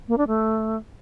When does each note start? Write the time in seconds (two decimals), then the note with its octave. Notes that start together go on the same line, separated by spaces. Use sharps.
0.08 A#3
0.18 D4
0.27 A3